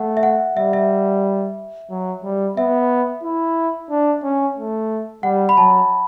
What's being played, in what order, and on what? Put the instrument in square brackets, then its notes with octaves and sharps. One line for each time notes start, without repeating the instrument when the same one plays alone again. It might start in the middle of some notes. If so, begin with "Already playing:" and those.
Already playing: [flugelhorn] A3 [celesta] F#5
[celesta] E5
F#5
[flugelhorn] G3 [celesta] E5
[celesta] E5
[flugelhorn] F#3
G3
[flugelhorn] B3 [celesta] E5
[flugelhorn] E4
D4
C#4
A3
[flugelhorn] G3 [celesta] F#5
[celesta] B5
[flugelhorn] F#3 [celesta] A5